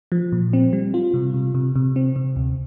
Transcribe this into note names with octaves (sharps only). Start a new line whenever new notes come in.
F3
A#2
C4
G3
F4
C3
C3
C3
C3
C4
C3
D2